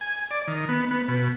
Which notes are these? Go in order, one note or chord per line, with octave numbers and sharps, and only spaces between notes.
G#5
D5
D#3
B3
B3
B2